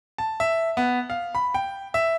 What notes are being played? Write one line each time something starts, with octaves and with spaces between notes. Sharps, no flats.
A5
E5
B3
F5
B5
G5
E5